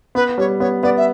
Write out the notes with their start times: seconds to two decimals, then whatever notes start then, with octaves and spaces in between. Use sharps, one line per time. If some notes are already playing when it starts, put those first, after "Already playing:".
0.15 B3 B4
0.38 G3 C#5
0.60 B3 C#5
0.83 B3 D5
0.97 E5